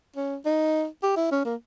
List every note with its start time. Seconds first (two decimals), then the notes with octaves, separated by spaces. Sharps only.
0.16 C#4
0.45 D#4
1.03 G4
1.17 E4
1.31 C#4
1.45 A#3